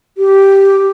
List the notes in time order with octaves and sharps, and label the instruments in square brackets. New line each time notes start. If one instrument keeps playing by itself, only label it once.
[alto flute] G4